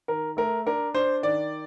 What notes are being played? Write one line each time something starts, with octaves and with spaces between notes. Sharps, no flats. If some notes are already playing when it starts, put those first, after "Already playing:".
D#3 A#4
A3 A#4
D4 A#4
D4 C5
D#3 D5